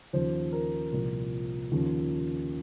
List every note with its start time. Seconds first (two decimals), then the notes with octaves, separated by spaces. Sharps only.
0.13 D#2 C#3 F3 C5
0.52 A#4
0.92 C2 A#2 F3
1.71 D#2 C#3 F3